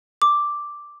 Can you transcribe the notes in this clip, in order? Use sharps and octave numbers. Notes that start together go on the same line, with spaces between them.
D6